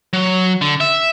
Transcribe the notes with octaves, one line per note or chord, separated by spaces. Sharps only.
F#3
D3
E5